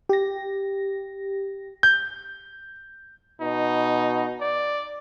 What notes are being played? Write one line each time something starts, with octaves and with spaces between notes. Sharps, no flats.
G4 A#6
G6
B2 D#4
D5